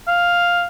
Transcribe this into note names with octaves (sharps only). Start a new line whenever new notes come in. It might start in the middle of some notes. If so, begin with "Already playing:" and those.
F5